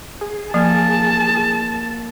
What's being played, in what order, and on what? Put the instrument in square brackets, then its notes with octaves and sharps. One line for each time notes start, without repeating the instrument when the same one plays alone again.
[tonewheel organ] G#4
[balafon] F3 [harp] A#3 F5 G#5 [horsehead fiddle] A5